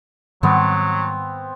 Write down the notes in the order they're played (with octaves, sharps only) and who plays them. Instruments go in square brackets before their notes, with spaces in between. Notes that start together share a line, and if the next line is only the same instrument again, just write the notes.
[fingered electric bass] G#2 D#3 G3 [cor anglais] F#3 [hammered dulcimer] B3 C4